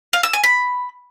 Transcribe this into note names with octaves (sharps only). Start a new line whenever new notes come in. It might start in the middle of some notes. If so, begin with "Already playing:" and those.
F5
E6
G#5
B5